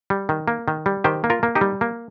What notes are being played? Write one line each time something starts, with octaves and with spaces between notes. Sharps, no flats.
G3
D#3
A#3
D#3
G3
D#3 G4 C5
A#3
F4 A#4
A#3
D#4 G4
G3
A#3